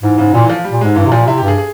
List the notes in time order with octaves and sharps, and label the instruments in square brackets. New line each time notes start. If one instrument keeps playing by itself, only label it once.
[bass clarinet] G#2 [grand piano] E3
[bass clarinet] G#2 [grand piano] C#3
[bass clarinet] A#2 [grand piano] E3
[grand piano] E3
F3
G3
[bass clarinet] A#2
[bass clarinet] G#2 [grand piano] G#3
[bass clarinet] G2 [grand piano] E3
[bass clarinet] C3
[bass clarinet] A#2 [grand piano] F3
[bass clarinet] C3 [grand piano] E4
[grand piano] G4
[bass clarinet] G2
[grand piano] G#4
G#4